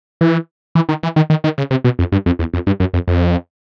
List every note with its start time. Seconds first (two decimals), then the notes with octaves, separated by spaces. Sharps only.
0.21 E3
0.75 E3
0.89 D#3
1.03 E3
1.16 D#3
1.30 D#3
1.44 D#3
1.58 C#3
1.71 C3
1.84 B2
1.99 F2
2.12 G2
2.26 F2
2.39 E2
2.54 F2
2.67 G2
2.80 F#2
2.94 F2
3.08 F2